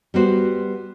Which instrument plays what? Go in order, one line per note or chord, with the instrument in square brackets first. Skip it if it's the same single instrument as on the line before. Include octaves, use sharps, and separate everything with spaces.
[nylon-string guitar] G3 B3 F#4 C5